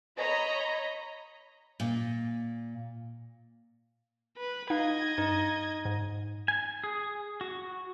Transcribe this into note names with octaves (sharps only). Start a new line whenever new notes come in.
C#5 D#5 A#5 B5
A#2
B4
D#4 D#5 F5 G#6
G2 D#4
G#2
G#5
G#4
F#4